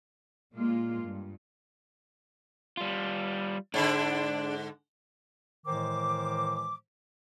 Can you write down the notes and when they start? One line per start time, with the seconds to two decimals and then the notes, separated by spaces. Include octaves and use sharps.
0.53 A#2 G#3 A#3 F4
1.04 G2
2.77 G3 F4
3.74 G#2 D3 D4
5.67 A2 D#3 E3 G#3 C5 D6